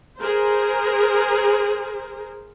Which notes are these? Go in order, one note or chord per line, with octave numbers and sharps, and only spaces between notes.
G#4 A#4 C5